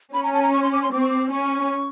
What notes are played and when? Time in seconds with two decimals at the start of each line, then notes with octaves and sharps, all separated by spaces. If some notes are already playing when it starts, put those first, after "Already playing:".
0.14 C#4 B5
0.23 A#5
0.33 A5
0.43 A#5
0.53 C#6
0.62 C6
0.73 D6
0.83 C6
0.92 C4 D6
1.01 C#6
1.09 D6
1.32 C#4 C#6